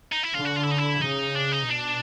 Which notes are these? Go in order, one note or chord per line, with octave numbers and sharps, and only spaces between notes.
D#4
E4
D3 F4
F#4
F4
E4
D#4
E4
C#3 D#4
D4
D#4
B2 D4